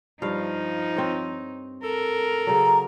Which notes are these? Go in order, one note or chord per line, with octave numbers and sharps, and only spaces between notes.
G2 F3 D#4 F5
C4 C#5
A4 A#4
C#3 F#3 A#5